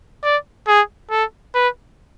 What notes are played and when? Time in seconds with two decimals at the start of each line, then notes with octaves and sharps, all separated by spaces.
0.24 D5
0.68 G#4
1.11 A4
1.55 B4